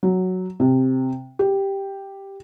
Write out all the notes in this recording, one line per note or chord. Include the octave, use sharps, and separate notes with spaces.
F#3
C3
G4